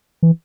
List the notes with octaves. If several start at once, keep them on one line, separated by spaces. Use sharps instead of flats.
E3